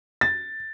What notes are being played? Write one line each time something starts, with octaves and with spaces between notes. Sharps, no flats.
A6